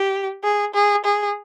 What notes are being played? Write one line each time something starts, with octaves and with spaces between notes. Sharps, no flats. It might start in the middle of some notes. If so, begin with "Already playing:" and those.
Already playing: G4
G#4
G#4
G#4